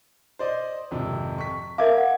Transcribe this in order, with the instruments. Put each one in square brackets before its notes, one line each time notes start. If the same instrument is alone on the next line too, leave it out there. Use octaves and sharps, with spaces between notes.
[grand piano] C5 D5 D#5
G#1 F2 C3
C#6 B6
[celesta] A#4 E5 F5 [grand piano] D6 G#6
[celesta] F#5